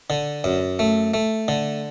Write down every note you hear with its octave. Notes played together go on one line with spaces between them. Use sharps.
D3
F#2
A3
A3
D3